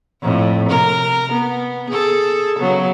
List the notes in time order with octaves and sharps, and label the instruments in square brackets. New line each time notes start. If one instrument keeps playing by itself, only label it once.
[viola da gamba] F2 A2
C3 A#4
B3
G#4 A4
C#3 F#3 B3